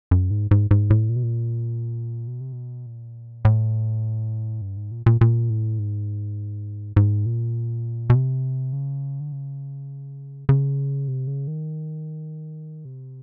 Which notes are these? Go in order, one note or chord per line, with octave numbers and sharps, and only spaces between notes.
F#2
G#2
G#2
G#2
A2
A#2
B2
A#2
B2
C3
B2
A#2
A2
G2
G#2
A#2
A#2
A#2
A2
G#2
G#2
A#2
B2
C3
C#3
D3
C#3
C#3
C3
C#3
D#3
C3